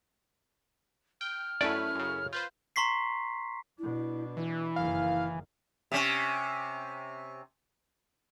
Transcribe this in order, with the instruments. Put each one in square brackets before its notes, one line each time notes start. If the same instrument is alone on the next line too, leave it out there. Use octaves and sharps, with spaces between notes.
[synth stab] G5 [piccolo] F6
[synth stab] F#2 A3 B4 [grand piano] C#4 E4 A4 [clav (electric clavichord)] D5
[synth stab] F#2 C#3
[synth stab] F4 B4 C5 [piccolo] G6
[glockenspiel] A#5 C6 C#6 B6 C7
[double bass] B2 D4 [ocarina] E4
[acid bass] E3 [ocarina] E4
[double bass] F#1 D#3 [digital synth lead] F5
[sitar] C3 C#4